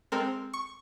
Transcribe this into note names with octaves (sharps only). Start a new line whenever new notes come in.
G#3 C4 A4 A#4
C#6